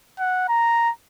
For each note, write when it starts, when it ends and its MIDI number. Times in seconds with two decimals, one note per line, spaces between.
0.19 0.46 78
0.49 0.90 82